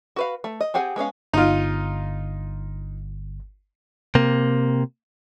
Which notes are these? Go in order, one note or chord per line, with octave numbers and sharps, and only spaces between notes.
F#4 B4 F5
A3
D#5
C4 G4 G#4 F#5 G#5
G#3 B3 C#4 F5
G1 D#4 F4
C3 A#3